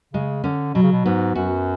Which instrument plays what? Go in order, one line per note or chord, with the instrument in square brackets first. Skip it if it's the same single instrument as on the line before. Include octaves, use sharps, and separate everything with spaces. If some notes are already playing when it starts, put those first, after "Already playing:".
[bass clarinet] C#3 [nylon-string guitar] G#3
[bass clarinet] D3 [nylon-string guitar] C#4
[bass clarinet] B2 [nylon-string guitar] F#3
[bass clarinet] C#3
B2
[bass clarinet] G#2 [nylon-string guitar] B3
[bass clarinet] F#2 [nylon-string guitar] F#4